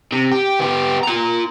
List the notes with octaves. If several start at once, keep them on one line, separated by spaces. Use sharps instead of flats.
C3
G4
B3 G4
F4 A#5